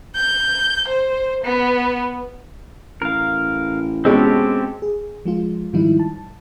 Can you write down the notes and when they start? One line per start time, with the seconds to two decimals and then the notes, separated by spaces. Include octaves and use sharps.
0.16 G6
0.88 C5
1.44 B3
3.02 A1 A#4 F5
4.05 B2 G#3 C4 C#4 G4 A4
4.82 G#4
5.26 F3 G#3 F4
5.73 G#2 D#3 F3 G3 D#4 E4
6.00 A5